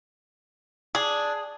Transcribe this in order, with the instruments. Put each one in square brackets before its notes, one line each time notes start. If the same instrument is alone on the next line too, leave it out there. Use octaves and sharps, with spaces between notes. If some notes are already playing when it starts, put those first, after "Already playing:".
[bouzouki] D4 [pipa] G#4